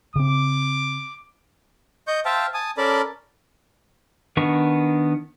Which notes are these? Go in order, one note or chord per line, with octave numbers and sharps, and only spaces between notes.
C#3 C4 D6
D#5 C#6 G6
C5 E5 F5 G5 A5
G#5 A5 D#6
C#4 A4 A#4 D5 A5 B5
D#3 B3 D4 A#4 C#6